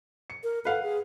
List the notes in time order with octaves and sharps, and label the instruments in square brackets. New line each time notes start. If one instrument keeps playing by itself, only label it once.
[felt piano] C#7
[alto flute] A#4
[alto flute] A4 [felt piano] B4 F5 F#5
[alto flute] G#4